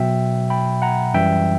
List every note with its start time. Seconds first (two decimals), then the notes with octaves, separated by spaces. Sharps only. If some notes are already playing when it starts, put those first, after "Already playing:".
Already playing: B2 F#3 E5 G5
0.50 G5 B5
0.82 F#5 A#5
1.14 F#2 E3 G3 E5 G5